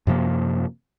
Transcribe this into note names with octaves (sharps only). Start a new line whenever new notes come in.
F#2 C3 F3 A#3